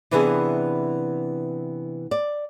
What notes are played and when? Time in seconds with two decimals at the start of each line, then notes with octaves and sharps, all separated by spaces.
0.11 C3 E3 B3 D4 E4 G#4
2.11 D5